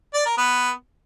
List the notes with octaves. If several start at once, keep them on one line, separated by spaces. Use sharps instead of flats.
D5
A#4
B3